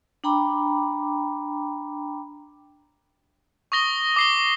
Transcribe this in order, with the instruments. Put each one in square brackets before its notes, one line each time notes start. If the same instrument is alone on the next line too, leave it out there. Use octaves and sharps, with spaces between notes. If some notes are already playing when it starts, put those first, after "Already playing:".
[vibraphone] D4 G5 A#5 B5 D6
[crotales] C#6 D#6 A#6 G7
D6 C7 G7